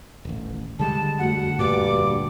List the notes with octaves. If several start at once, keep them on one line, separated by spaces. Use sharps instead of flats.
D#1 A1
D3 G3 G#3 A5
F2 A3 F#4 F#5
D2 G2 A#2 D6